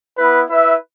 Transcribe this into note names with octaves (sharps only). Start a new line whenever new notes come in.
B3 E4 B4
E4 B4 E5